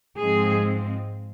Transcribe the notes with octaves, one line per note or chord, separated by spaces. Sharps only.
G#2 F3 G#3 C4 G#4